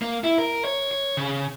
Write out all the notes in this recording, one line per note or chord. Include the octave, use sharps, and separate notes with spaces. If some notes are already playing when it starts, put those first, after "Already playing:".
A#3
E4
A#4
C#5
C#5
C#3